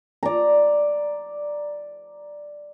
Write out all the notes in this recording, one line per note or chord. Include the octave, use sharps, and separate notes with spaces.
D5 A#5